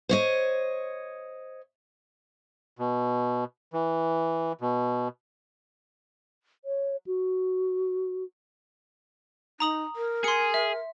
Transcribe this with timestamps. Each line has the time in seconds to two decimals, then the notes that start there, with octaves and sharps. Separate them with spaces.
0.09 C5 C#5 D#5
2.79 B2
3.73 E3
4.61 B2
6.65 C#5
7.07 F#4
9.60 D#4 A#5 D#6 F#7
9.96 A#4
10.24 G#4 C6 C#7
10.54 E5